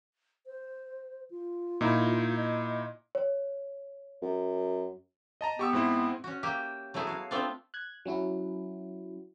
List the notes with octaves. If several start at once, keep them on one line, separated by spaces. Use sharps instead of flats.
C5
F4
A#2 D#4 E4
D#5
C#5
F#2
D#5 A5 A#5
B3 G4 C#6 E6
G#2 C4 E4
C#4 F#4
A#3 G4 E5
F#3 A3 B3 E4 G#4
F#4 F5
A3 B3 C4 D4 F4
F#6 G#6
F#3 C#4 E4 F#4